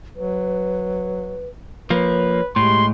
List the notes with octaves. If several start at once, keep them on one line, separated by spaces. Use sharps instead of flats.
F#3 B4
F3 A#3 B4 C#5
A2 G#3 G4 C6